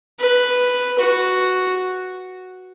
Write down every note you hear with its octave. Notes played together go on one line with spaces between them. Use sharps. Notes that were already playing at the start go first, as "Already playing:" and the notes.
B4
F#4